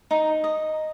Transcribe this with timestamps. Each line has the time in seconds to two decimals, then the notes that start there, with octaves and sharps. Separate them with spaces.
0.11 D#4
0.44 D#5